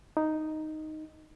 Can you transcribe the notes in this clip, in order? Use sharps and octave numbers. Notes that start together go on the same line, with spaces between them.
D#4